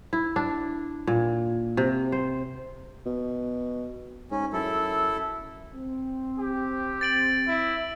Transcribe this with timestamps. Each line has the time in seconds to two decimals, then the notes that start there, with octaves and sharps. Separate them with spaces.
0.13 E4
0.36 D4
1.07 A#2
1.77 C3
2.12 C5
3.06 B2
4.31 G#2 C#4
4.53 F#2 E4 A4
5.74 C4
6.39 G4
7.01 A6 D7 F#7
7.47 E4